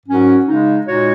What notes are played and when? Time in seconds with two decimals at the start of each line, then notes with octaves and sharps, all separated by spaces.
0.06 G#2 F#3 C#4 F#4 A#4
0.46 C#3 G#3 D#4
0.86 A#2 G#3 D#4 F#4 C#5